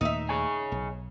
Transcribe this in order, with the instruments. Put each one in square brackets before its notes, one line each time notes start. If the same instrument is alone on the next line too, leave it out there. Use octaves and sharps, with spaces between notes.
[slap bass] D#2 A#2 A3 [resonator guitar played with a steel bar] D#4 E5
[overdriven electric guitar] G#4 C#5
[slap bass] B1